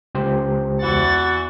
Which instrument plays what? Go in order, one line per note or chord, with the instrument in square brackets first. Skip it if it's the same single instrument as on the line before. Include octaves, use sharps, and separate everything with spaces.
[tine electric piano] C#2 G4 C5
[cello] E2 F#5 [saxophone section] E3 F#4 [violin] A6